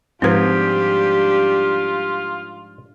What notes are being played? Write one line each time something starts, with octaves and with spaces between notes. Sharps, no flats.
G#2 F3 G3 C4 D4 F4 G4 B4